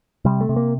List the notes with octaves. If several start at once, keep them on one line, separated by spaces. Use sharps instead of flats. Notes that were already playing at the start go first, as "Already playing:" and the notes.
C3 G3
A3
C3
A#3